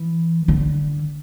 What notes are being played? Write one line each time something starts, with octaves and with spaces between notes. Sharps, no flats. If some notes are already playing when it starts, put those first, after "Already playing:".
Already playing: E3
D3